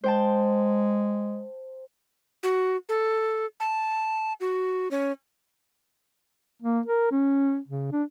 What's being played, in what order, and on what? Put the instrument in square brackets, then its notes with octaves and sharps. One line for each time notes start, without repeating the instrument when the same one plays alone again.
[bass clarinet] G#3 [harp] C5 G5 A5
[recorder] F#4
A4
A5
F#4
C#4
[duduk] A#3
A#4
C#4
C#3
D4